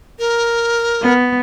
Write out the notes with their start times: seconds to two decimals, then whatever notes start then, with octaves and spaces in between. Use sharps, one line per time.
0.19 A#4
1.01 B3